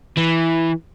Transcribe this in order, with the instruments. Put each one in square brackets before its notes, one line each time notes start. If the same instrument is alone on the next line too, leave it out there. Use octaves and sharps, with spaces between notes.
[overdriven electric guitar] E3